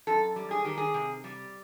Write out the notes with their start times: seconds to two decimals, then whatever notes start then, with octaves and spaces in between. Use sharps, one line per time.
0.07 F#2 A4
0.36 G3
0.51 G#4
0.65 D#3 G4
0.78 G#4
0.94 C3
1.24 G3